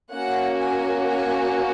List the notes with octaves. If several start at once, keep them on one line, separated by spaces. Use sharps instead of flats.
A#3 C#4 F#4 F#5
G#5
G#5